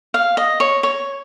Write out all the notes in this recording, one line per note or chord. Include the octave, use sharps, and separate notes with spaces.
F5
D#5
C#5
C#5